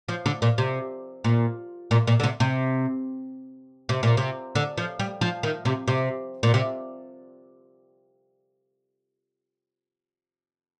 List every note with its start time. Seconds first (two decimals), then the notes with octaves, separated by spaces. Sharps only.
0.08 F3
0.26 D3
0.42 A#2
0.58 C3
1.24 A#2
1.91 A#2
2.07 A#2
2.20 D3
2.23 C3
2.40 C3
3.89 C3
4.03 A#2
4.17 C3
4.55 D3
4.77 F3
4.99 G3
5.21 F3
5.43 D#3
5.65 C3
5.88 C3
6.43 A#2
6.54 C3